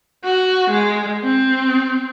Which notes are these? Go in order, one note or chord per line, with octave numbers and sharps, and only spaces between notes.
F#4
G#3
C4